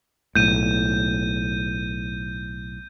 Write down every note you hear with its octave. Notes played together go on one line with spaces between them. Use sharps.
B1 A2 G6 D#7